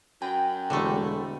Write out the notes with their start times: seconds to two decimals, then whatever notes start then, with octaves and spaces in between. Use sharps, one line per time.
0.22 F#2 G5
0.70 E1 D3 G3 A3